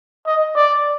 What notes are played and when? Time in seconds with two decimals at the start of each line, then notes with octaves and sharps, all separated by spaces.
0.26 D#5
0.55 D5